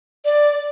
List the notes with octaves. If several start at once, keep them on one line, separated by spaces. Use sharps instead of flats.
D5